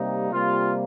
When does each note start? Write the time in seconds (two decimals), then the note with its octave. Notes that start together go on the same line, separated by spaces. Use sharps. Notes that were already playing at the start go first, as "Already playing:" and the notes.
Already playing: C3 G3 A#3 D#4
0.32 C3 G3 A#3 F4